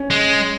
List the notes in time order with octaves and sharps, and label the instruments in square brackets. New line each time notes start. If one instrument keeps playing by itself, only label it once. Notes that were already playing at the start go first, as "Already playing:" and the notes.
Already playing: [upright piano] C#4
[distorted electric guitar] G#3